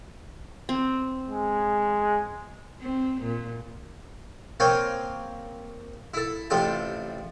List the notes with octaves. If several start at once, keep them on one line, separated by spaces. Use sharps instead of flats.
C4
G#3
C4
A#2
A#3 C4 C#5 F5 G5 G#5
E4 A4
A1 C3 F4 A4 G5 A5